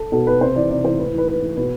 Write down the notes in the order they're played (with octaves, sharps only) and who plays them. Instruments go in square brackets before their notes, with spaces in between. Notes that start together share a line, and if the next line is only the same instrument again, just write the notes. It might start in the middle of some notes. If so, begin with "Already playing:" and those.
Already playing: [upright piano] A4
B2 A4
B4
C3 C5
E3 D5
C3 D5
E3 C5
A2 B4
E3 B4
A2 B4
E3
B2 B4